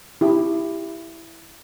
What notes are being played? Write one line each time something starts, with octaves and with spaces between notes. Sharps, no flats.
E4 G4